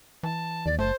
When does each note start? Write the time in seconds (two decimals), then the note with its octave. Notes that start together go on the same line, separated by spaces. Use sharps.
0.23 E3 A5
0.66 D#2 D5
0.79 F#1 A3 C5 A5